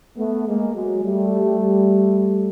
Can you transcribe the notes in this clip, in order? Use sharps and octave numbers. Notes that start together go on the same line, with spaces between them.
A3 B3
G#3 A#3
F#3 G#3
G3 A3